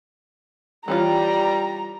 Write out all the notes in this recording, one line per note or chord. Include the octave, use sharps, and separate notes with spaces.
E3 G3 C#4 F4 A#5